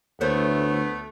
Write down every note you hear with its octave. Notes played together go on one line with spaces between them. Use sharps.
D2 A3 B3 E4 C5 C#5